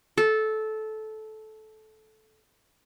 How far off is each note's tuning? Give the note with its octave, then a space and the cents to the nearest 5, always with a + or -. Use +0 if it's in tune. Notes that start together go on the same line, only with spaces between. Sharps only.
A4 -15